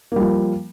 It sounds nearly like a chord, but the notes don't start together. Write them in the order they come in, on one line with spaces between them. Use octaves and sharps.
A#3 G3 F3